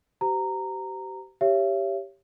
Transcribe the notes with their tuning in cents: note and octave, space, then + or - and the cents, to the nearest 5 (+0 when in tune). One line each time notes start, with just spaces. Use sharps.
G4 -35 C5 -45 A#5 -15
G4 +0 C#5 +0 E5 +40